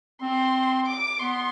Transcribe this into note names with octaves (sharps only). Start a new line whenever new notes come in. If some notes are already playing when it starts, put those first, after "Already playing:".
C4 C6
D6
B3 C6